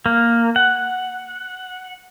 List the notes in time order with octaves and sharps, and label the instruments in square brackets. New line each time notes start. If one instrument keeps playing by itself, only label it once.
[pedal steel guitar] A#3
F#5